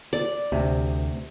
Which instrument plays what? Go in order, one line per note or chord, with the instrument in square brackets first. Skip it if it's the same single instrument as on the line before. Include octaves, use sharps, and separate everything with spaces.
[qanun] D5
[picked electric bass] D2 [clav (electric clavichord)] C3